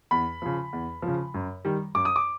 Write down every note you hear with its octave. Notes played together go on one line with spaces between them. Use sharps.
E2 B5
C#3 F3
E2
F3
C#3
F#2
D#3 G3
F#2 D6
D#6
D6